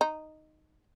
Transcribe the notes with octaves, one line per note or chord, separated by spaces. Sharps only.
D#4